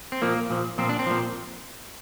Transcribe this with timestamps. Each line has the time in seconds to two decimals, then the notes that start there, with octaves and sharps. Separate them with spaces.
0.12 C4
0.22 A#2 F3 A#3
0.50 A#2 F3
0.78 A#2 F3 C4
0.89 D4
0.99 C4
1.07 A#2 F3